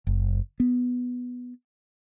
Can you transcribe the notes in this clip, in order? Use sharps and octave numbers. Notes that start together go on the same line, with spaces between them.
F#1
B3